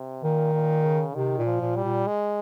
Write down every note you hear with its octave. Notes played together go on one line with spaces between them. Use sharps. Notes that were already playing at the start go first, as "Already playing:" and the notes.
Already playing: C3
A#2 D#3
A#2
C#3
C3 D#3
A#2
F3
A#2
G3
A#2
G#3